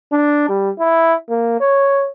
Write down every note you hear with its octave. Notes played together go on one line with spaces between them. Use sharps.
D4
G3
E4
A#3
C#5